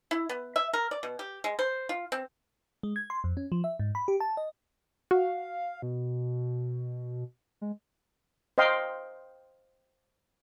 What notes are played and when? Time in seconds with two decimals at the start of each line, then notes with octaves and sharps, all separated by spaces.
0.11 E4
0.29 B3
0.56 E5
0.73 A#4
0.91 D5
1.03 B2
1.19 G4
1.44 G#3
1.59 C5
1.89 F4
2.12 C4
2.83 G#3
2.96 G#6
3.10 C6
3.24 F2
3.37 C#4
3.52 F3
3.64 E5
3.80 G#2
3.95 B5
4.08 G4
4.20 A5
4.37 D#5
5.11 F#4 F5
5.82 B2
7.61 G#3
8.58 C5 D#5 F5 G5 C6